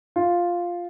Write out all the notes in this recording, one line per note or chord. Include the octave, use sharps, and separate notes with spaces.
F4